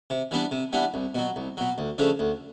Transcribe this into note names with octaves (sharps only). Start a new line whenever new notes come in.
C3
E3 G3 B3 D4
C3
E3 G3 B3 D4
C2
B2 F#3
C2
B2 F#3
D2
C#3 F3 A3 D4
D2